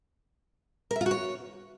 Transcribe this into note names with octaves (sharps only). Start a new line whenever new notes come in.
A#4
E5
F4
F#4
C#5